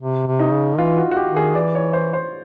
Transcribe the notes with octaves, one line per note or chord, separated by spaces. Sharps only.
C3
C3
D#4
C#3
E3 F4
F#4
F#4
G4
D#3
G#4
E3 D5
C#5
C5
C5